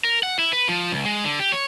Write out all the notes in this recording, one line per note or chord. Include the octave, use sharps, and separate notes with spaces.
A#4
F#5
E4
B4
F3
C#2
G#3
D3
G4
C#5